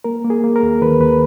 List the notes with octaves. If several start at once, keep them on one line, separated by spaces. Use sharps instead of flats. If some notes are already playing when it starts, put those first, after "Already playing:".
A#3 A#4
A#3
G#4
A#3
A#4
D#2
D#3 B4
D#2 B4